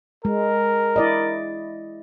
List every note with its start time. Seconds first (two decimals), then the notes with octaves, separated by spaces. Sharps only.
0.25 G#3 A#4
0.96 E4 D5 D#5